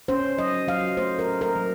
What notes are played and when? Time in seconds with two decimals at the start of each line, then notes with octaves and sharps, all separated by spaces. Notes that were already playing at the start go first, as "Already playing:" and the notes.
0.08 C#4 C5
0.38 F#3 D#5
0.68 F#3 F5
0.97 A3 C5
1.19 A#4
1.26 C#4
1.41 A#4
1.56 F#3